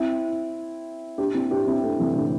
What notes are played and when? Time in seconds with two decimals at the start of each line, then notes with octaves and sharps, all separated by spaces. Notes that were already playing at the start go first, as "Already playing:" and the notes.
Already playing: C4 E4
1.18 D4 G4
1.34 C4 E4
1.51 D4 G4
1.67 C4 E4
1.83 A3 D4
2.00 C3 E3
2.15 A2 D3